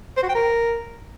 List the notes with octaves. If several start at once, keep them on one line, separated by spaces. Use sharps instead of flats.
C5
F#4
G5
A#4